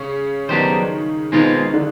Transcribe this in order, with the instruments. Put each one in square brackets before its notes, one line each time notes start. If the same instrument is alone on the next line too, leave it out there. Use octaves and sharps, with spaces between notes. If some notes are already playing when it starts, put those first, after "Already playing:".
Already playing: [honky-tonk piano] C#3 C#4
[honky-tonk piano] D#3 D#4 [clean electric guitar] F#3 B3 D4 G4 C5
[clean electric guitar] B2 G#3 C4 F4 [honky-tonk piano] D#3 D#4
[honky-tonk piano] D3 D4